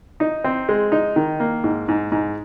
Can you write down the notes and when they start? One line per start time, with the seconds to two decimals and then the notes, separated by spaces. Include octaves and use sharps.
0.20 D#4
0.44 C4
0.69 G#3
0.92 D#4
1.16 D#3
1.40 A#3
1.64 G#2
1.88 G#2
2.12 G#2